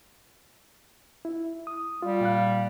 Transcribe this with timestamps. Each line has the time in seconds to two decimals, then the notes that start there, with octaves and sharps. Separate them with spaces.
1.25 E4
1.67 D#6
2.02 G3 F4
2.21 A#2 F5 F#6